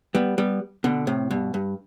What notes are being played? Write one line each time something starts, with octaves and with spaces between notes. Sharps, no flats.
G3 B3
G3 B3
B2 D3
A2 C3
G2 B2
G2